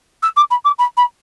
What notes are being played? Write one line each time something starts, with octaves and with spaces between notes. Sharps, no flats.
E6
D6
B5
D6
B5
B5